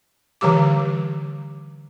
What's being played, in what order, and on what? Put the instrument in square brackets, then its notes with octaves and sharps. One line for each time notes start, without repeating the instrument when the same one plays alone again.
[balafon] D3 E3 G3 G4 D6